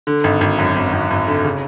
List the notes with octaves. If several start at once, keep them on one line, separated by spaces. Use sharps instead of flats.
D3
G#1
G#1
F#2
G#1
G#1
G#1
D3
C#3